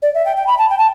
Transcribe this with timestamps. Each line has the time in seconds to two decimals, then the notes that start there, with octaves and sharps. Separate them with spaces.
0.02 D5
0.14 E5
0.26 G5
0.37 G5
0.47 B5
0.59 A5
0.70 G5
0.79 A5